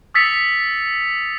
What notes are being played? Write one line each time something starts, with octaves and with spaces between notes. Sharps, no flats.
D#6 E6 A6 B6 C#7 F7